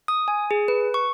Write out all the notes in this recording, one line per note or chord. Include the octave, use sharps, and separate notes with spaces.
D#6
G#5
G#4
B4
C#6